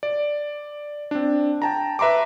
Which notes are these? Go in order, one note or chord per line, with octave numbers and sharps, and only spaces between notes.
D5
C4 D4
G5 A5 A#5
B4 E5 A#5 C6 D6